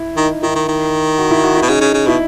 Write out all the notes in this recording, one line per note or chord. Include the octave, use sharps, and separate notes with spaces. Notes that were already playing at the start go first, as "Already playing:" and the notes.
Already playing: E4
D#3 D#4
D#3 E4
D#3
D#3
F#4
E4
F#4
E4
B2
C#3 D#4
C#3
C#3
B2 E4